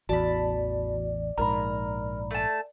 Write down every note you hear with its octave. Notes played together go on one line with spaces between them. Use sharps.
A1 E2 F#4 D5 A5 B5
A#1 G#2 A#4 A#5 B5
A3 A5